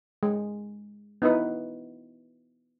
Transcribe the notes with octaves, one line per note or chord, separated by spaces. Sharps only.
G#3
B3 D#4 E4 B4